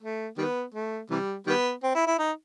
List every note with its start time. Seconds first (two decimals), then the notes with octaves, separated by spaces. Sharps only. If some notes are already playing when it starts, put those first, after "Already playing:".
0.02 A3
0.38 D#3 G3 B3
0.74 A3
1.10 C3 E3 G3
1.47 D#3 G3 B3
1.83 C4
1.95 E4
2.07 E4
2.19 D#4